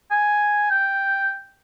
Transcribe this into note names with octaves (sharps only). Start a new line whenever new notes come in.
G#5
G5